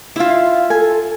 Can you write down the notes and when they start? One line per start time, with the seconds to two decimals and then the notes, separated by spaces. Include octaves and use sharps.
0.16 E4 F4 E5 F5
0.70 A4 G#5